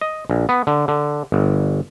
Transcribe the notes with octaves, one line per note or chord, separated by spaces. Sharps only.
D#5
A#1
B3
D3
D3
G1